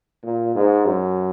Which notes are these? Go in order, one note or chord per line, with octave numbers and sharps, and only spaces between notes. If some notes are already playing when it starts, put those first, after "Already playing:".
A#2
G#2
F#2